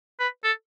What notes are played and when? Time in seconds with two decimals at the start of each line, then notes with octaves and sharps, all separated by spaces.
0.20 B4
0.44 A4